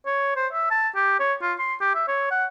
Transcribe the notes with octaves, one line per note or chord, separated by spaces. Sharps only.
C#5
C5
E5
A5
G4
C#5
F4
C6
G4
E5
C#5
F#5